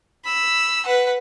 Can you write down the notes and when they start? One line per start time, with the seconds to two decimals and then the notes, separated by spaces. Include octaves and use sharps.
0.25 B5 E6
0.86 B4 F#5